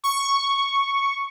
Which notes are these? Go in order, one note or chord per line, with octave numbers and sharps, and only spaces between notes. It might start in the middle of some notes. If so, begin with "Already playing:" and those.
C#6